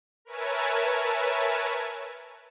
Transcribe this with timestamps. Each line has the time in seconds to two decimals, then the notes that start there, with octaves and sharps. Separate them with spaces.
0.25 A#4 B4 C#5 E5 G#5 A5